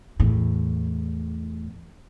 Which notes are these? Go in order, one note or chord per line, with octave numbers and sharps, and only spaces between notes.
E2 A2